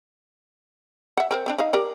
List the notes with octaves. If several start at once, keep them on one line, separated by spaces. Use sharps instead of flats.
E5 F#5
C4 A#4 C5
B3 C4 D4
D#4 D#5 F5
G4 A#4 D5